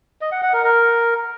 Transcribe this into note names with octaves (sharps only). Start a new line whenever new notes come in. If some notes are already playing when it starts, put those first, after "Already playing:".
D#5
F#5
F#5
A#4
A#4